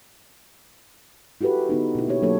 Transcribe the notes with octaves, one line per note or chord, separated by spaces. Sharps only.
E4 F#4 G4 A4 B4
D3 B3 D#4
B2 E4
A#3 B3 G4 C#5
F#3 A#3 D4 A4 C#5